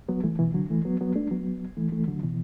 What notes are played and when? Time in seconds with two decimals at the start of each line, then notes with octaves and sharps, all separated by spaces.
0.09 F#3 B3
0.24 E3 A3
0.39 B2 E3
0.54 D3 F#3
0.70 E3 A3
0.85 F#3 B3
1.01 F#3 B3
1.15 A3 D4
1.31 F#3 B3
1.77 E3 A3
1.92 E3 A3
2.08 D3 F#3
2.23 B2 E3